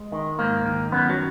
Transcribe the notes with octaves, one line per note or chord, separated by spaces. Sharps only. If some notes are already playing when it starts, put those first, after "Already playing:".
Already playing: G#3
D#3
G#2 A#3
D#3
F#2 B3
F#3